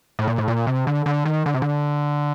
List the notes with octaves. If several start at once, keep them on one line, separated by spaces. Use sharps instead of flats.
A2
A#2
A2
A#2
C3
D3
D3
D#3
D3
C3
D3